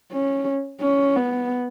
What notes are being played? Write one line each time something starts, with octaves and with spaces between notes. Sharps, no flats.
C#4
C#4
B3